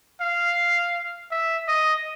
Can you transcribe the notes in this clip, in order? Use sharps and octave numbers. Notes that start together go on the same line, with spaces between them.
F5
E5
D#5